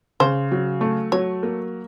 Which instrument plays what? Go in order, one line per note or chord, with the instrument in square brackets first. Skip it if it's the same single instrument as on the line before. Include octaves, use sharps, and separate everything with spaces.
[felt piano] C#3 [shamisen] C5
[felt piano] F#3
A3
[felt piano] F#3 [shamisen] C#5
[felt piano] A#3